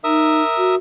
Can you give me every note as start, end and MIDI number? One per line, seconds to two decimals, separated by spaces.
0.04 0.43 63
0.04 0.75 70
0.04 0.75 76
0.04 0.75 87
0.58 0.76 66